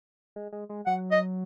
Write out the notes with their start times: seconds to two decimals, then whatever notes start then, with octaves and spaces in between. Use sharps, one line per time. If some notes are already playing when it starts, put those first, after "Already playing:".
0.36 G#3
0.52 G#3
0.69 G#3
0.87 F#3 F#5
1.12 D#5